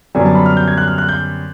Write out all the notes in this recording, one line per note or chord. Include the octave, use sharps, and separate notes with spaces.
F#2 D3 G3 B3 G#5
A5
B5
F6
G6
G#6
F#6
F6
F#6
G6